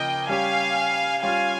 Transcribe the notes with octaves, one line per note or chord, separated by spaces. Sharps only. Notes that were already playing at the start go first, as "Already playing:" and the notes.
Already playing: C#3 F3 A#3 D#5 G5
G3 C#4 G4 F5 G#5
G3 C#4 F4 F5 G#5